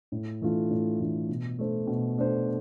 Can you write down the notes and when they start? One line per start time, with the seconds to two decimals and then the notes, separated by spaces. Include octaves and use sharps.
0.12 A2
0.42 E3 A3 D4 F4
0.71 A2
0.99 E3 A3 D4 F4
1.29 B2
1.59 A3 D4 A4 C5
1.87 B2
2.18 A3 D4 A4 C5